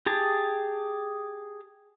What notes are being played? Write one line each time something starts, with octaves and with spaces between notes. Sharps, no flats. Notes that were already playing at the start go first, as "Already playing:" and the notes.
G4 G#4 A5